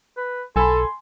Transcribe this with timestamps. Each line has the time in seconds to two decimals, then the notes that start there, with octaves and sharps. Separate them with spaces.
0.17 B4
0.56 B1 A4 G#5 B5 C6